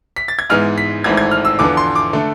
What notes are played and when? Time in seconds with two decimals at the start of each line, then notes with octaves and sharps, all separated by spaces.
0.16 B6
0.28 A6
0.39 G#6
0.50 G#2 E3 G#3 B3 F6
0.78 B6
1.04 G#1 G#2 E3 A3 C4 G#6
1.17 G#6
1.31 F6
1.45 E6
1.59 E2 D3 F3 B3 D6
1.77 C6
1.95 D6
2.13 D3 A3